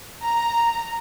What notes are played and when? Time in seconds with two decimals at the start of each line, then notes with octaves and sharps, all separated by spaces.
0.23 A#5